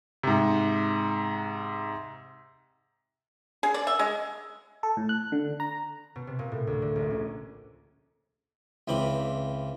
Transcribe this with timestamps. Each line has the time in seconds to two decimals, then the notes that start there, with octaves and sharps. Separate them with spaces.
0.23 G#2 C3
3.63 G#4
3.74 D5
3.87 E5
3.99 G#3
4.83 A4
4.97 A2
5.09 F#6
5.32 D3
5.60 A#5
6.16 B2
6.27 C3
6.39 A#2
6.52 A2
6.67 D2
6.82 D3
6.96 A#1
7.11 C#4
8.88 C#2 E3 C4 B5 D6